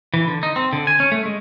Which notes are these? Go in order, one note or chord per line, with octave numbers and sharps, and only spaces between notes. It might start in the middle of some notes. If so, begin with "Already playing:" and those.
E3
D3
D#4
C4
D3
G#5
C#4
A3
G#3